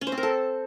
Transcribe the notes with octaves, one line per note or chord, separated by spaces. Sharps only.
C#4
C5
C4
A#4
A4